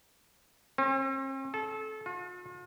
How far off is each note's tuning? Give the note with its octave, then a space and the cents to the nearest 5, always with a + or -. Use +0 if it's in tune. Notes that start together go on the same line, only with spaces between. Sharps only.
C4 +45
A4 -25
F4 +45